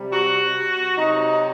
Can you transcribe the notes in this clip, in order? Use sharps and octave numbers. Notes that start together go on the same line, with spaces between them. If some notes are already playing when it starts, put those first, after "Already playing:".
Already playing: C3 G3
F#4
C3 F#3 D#4